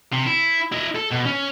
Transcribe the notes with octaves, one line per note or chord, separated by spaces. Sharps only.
C3
E4
E4 D#5
A4
B2
C#4